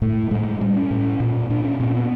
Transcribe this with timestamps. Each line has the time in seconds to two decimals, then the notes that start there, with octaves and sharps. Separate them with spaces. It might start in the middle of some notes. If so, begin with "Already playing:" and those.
0.02 A2 A3
0.31 A2 G#3
0.61 A2 G3
0.76 C#4
0.91 A2
1.20 A#2
1.50 A#2 D4
1.64 C#4
1.80 A#2 C4
1.95 B3